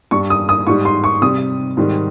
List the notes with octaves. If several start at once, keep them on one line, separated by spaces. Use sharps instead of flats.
G2 G3 C#6
D#6
D#6
G#2 G3 C#6
C6
C#6
C3 G3 D#6
G#2 D#3 G3